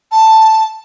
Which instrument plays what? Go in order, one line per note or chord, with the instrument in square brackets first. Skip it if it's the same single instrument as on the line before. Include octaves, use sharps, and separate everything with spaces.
[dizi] A5